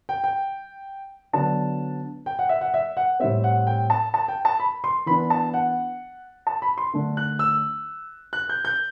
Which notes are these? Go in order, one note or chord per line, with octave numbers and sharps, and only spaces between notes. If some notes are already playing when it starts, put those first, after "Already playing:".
G5
G5
D3 F#3 B3 D4 A5
G5
F#5
E5
F#5
E5
F#5
A2 G3 C4 E5
F#5
G5
A5
A5
G5
A5
B5
C6
E3 B3 D4 B5
A5
F#5
A5
B5
C6
D3 A3 D4
F#6
E6
F#6
G6
G6